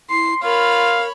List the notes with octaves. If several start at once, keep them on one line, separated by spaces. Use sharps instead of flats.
E4 C6 C7
F4 A#4 C#5 F5 B5